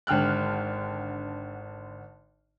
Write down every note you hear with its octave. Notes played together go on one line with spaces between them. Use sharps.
G#1 D3 G5 F6 F#6